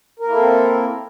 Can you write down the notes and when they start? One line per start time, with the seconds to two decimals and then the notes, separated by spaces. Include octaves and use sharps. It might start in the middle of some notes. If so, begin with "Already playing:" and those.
0.19 A#4
0.24 A#3
0.28 E4
0.33 A4
0.37 C4